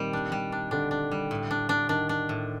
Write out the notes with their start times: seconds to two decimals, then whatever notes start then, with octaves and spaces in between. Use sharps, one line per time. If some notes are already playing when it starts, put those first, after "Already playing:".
Already playing: A#2 D#3 G3 C4 G4
0.13 D4
0.32 G3
0.52 D4
0.71 D3 D4
0.91 D4
1.11 G3
1.31 A2
1.51 D4
1.69 D4
1.89 D#3 D4
2.09 D4
2.29 A2